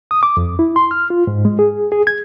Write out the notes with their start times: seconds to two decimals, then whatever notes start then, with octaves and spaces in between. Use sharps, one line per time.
0.11 D#6
0.23 D6
0.37 F2
0.59 E4
0.76 C6
0.91 F6
1.10 F4
1.27 G#2
1.45 G#3
1.59 G#4
1.92 G#4
2.07 G#6